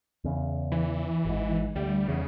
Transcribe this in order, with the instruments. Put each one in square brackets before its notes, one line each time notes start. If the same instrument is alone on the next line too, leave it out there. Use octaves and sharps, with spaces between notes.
[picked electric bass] E2 C#3
[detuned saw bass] E3
[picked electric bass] G#1 G#2
[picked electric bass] D2 [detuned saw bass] G3
[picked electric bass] E2 [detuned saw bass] C#3